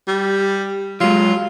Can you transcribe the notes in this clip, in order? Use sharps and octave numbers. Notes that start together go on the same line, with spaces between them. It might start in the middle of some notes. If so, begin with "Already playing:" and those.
G3
F#3 G#3 F4